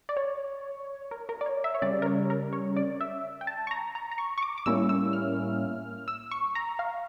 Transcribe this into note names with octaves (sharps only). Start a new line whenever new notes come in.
D5
C#5
A#4
A#4
D5
C#5
E5
C#5
C#3 G3 C#4 D5
A#4
C#5
A#4
C#5
D5
E5
G5
A5
C#6
A#5
A#5
A#5
C#6
C#6
D6
D6
A2 G3 A#3 C#4 E4 E6
E6
F6
E6
C#6
A#5
F5